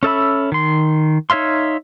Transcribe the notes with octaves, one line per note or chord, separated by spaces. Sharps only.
C#4 A4 E5 B5
D#3 C6
D#4 C#5 E5 F5 C6